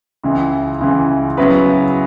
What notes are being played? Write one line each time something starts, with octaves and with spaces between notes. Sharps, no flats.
C#2 C#3 E3
C#2 C#3 E3
C#3 F#3 B3 E4 B4